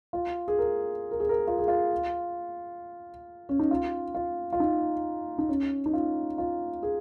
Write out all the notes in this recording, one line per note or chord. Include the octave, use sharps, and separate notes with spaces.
F4
G#4
A#4
A#4
G#4
A#4
F4
G#4
F4
C#4
D#4
F4
F4
F4
D#4
D#4
C#4
D#4
F4
F4
G#4